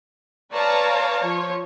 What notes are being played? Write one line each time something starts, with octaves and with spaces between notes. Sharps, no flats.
B4 C#5 D5 F5 A5 A#5
F3 C#5